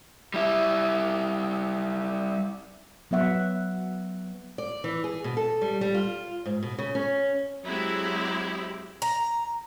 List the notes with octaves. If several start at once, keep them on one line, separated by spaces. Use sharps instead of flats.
G3 E4
F#3 B3 E5 F#5
D5
E3
G#4
B2
A4
G3
G3
F4
G#2
B2
C#3
C#4
F#3 G#3 C4 E4 G4
A#5